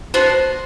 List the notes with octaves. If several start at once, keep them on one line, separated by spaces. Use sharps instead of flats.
B3 D4 F#4 C5